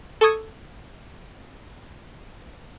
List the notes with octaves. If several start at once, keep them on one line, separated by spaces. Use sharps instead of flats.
A4 A5 C#6 D#6 G#6